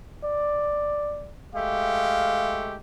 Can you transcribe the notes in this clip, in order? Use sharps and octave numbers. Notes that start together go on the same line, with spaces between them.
D5
G#3 A3 G4 F5